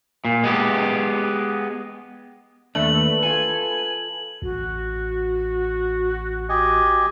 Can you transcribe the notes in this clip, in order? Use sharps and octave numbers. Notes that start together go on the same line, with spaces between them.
A#2
G#3 B3 G4
D#2 A3 D4 B4 F#7
F4 A4 G#5
A1 F#4
G4 D#5 G#5